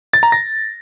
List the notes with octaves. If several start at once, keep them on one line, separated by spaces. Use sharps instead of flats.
A6
A#5
A#6